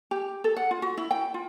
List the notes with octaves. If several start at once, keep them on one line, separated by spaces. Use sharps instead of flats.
G4
A4
F#5
F4
F#4
E4
G5
F4